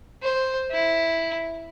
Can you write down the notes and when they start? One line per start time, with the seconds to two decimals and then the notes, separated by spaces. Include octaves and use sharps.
0.23 C5
0.71 E4